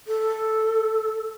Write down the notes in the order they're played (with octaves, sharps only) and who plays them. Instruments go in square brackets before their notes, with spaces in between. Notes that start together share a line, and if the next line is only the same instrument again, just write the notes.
[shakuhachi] A4